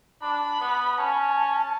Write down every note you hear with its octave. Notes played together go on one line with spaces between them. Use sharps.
D4 B5
B3
C#4 A5